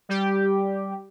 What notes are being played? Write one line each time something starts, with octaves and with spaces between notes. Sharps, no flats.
G3 G4